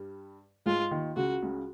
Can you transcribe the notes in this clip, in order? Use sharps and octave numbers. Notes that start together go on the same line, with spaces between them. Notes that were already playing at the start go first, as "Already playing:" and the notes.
Already playing: G2 G3
G#2 G#3 F4
D#2 D#3
C#2 C#3 F#4
C#2 C#3